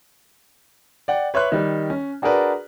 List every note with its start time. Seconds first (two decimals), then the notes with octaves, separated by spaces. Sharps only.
1.08 D5 F#5 G5
1.34 B4 C#5 E5 C6 F#6
1.52 D#3 G3
1.90 C#4
2.22 D4 F#4 G#4 A#4 B4 D5